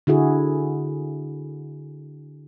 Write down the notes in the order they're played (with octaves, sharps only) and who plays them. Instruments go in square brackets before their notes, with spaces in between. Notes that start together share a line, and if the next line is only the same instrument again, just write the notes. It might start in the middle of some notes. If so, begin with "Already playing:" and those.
[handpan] D3 E4 F#4 G#4